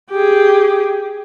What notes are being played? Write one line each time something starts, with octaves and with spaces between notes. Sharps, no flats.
G4 G#4